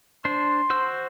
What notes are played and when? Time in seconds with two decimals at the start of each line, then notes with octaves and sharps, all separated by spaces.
0.25 D4 C5 C6
0.70 F#4 C5 E6